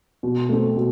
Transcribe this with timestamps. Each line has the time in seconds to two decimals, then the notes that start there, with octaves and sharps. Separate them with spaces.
0.23 B2
0.49 A3 C4
0.77 B2